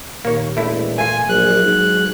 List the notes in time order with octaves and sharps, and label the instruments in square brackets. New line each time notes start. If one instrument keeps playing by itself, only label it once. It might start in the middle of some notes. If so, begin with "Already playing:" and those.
[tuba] D#2 [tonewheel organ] A#2 [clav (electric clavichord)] A#3 C#5
[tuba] E1 [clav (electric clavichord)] A3 E4
[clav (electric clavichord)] A3 F4 [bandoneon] G#5
[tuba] A#1 [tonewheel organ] F#3 G#4 [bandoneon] F#6
[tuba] G#2